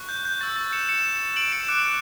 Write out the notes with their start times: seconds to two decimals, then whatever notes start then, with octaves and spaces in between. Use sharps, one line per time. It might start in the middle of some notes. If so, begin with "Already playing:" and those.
Already playing: C#6 F#6
0.09 G6
0.25 G6
0.41 C#6 E6 G6 A6
0.56 A6
0.72 C#7 E7
0.89 C#7 E7
1.36 D7 F#7
1.52 C#7 E7
1.68 D6 F#6 C#7 E7